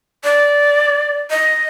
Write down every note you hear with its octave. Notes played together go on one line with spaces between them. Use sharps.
D5
D#5